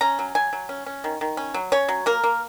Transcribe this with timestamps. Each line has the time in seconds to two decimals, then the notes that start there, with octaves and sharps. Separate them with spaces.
0.01 C#4 A#5
0.19 F#3
0.35 F#3 G#5
0.53 F#3
0.69 C#4
0.86 C#4
1.04 D#3
1.21 D#3
1.37 C#4
1.54 F#3
1.72 C#4 C#5
1.88 F#3
2.06 A#3 A#4
2.23 A#3